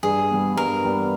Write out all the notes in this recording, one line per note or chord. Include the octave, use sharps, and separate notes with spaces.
G2 G#4
G3 B3
G2 A#4
G3 B3